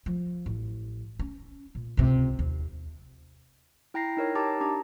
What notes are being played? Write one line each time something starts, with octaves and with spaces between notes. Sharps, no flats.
F3
A1
C#4
A#2
C#2 C3
D#2
E4 G5 A#5 A#6 C7
D#4 A#4 C#5 G5
D#4 G4 A5 A#5 D6 A6
D4 G4 A#5